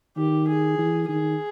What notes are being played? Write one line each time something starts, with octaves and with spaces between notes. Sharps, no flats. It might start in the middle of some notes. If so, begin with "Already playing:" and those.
D#3 G4
G#4
E3
D#3 G#4